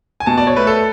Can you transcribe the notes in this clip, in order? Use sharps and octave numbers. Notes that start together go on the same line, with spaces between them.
G#5
B2 A5
D5
C#5
A3 B4
A4